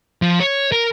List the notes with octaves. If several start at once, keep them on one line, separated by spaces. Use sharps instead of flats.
F3
C#5
A#4